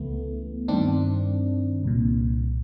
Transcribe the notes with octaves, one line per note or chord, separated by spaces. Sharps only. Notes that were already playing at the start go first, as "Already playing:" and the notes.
Already playing: C#2 C#3 E3 A3 B3
G2 D#3 C4 D4
C2 A#2